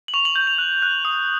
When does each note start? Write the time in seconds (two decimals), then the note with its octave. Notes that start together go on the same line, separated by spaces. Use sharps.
0.08 F#7
0.14 C#6 F7
0.25 F#7
0.35 G6 F#7
0.47 F7
0.58 F#6
0.82 F#6
1.05 D#6